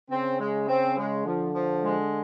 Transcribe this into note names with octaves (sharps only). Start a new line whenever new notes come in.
C#3 C4
G#3
C4
G#3
D3 F3
F3
G#3